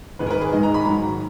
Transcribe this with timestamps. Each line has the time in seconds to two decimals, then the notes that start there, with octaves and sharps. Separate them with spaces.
0.19 G#2 D#3 G#3 B4
0.27 A#4
0.31 B4
0.41 G#4
0.52 G#2 D#3 G#3 D#5
0.63 A#5
0.74 B5
0.85 G#2 D#3 F#3 A#5